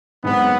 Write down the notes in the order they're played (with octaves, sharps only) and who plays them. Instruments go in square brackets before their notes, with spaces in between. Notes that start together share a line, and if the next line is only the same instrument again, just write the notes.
[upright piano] F#1 F#2 D#3 G#3 C4 [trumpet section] B3